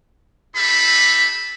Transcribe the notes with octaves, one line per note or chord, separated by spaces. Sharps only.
D#4 G4 A4 E5 B5